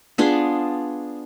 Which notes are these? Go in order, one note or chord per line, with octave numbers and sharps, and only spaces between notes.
B3 D4 F4 G#4